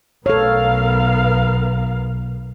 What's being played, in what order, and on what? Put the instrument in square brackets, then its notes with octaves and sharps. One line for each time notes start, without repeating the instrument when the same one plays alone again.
[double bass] B1 [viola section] B3 A#4 F5 [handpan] A4 C#5